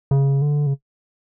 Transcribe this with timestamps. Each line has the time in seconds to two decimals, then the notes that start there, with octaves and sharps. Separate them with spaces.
0.11 C#3
0.42 D3
0.67 C#3